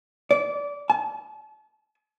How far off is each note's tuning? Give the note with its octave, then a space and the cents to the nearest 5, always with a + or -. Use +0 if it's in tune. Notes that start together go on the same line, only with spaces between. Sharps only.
D5 -25
A5 -35